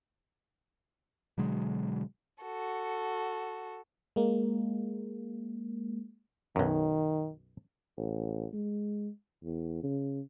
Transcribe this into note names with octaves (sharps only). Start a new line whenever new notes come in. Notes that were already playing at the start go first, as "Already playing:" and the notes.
B2 D3 F#3 G#3
F#4 A4
G#3 A#3
B1 F#2 D#3
A1
G#3
E2
C#3